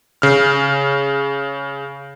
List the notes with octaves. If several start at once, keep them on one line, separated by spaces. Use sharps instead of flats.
C#3 F6